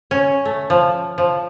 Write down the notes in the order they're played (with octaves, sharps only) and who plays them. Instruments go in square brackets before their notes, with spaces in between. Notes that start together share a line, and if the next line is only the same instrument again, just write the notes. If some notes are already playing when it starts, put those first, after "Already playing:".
[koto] C#4
A3
F3
F3